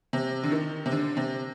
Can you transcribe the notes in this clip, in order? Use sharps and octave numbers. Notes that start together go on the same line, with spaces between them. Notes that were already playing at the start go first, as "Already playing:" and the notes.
C3
D3
D#3
C3
D3
C3